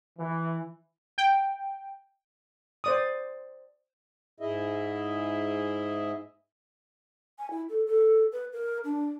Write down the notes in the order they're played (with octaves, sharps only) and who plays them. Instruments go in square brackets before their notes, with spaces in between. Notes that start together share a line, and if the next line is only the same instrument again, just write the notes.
[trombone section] E3
[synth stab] G5
[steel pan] C5 D5 D#6
[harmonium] G#2 E4 G#4 D#5 E5
[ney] G#5
E4
A4
A4
B4
A#4
D4